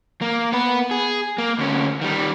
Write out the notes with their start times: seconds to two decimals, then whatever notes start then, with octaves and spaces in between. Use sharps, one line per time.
0.21 A#3
0.52 B3 B4
0.91 G#4
1.38 A#3
1.58 D2 C#4
2.01 D#3 G3